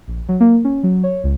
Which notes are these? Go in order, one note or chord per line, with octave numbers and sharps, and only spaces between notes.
A#1
F#3
A#3
C#4
F#3
C#5
C#2